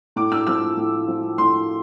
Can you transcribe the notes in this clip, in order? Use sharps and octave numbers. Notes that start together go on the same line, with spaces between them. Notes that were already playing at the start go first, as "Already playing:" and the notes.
A2 D6
E6
F3 E6
A2
F3
A2 C6